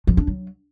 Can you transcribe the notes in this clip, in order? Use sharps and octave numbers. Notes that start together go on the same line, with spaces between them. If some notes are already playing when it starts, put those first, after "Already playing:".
F3
D4
F#3